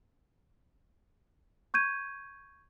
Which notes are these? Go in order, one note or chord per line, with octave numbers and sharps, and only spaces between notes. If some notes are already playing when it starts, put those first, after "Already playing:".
C#6 G6 G#6 D#7